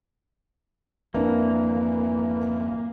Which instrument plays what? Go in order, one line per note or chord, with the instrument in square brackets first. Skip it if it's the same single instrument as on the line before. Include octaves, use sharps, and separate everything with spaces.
[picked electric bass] G#1 F2 [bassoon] E3 [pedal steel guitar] A#3 [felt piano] D4 E4 A#4